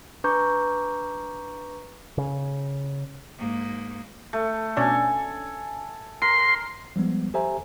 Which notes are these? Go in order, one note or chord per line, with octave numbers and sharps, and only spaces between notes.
D4 B4 A#5 C#6 D6 G6
C#3
G#2 A#3
A3
B2 C#4 D4 A4 G#5
A#4 C6
F3 G3 G#3 B3
G4 A4 C5 E5 G#5 A#5